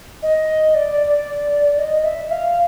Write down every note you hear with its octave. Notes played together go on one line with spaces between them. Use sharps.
D#5
D5
D#5
E5
F5